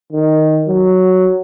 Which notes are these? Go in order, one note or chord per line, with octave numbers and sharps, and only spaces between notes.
D#3
F#3